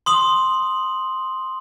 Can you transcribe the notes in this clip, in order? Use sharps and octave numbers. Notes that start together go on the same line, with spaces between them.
C6 D#6 F#7